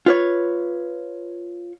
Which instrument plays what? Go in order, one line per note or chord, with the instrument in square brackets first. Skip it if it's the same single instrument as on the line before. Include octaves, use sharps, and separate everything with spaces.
[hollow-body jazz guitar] F4 B4 C#5